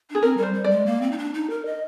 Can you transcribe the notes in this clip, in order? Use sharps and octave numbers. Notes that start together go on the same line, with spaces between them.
D4 G#4
C4 A#4
G3
C5
G3
D5
G#3
A#3
C4
D#4
D4
D#4
A#4
D#5